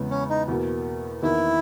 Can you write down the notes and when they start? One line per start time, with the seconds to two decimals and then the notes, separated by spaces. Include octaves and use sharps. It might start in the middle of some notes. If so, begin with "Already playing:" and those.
Already playing: E2 C#3 G#3 B3
0.11 C#4
0.30 D#4
0.48 E2 B2 A#3
1.22 E2 D#3 A#3 D#4 E4 A#4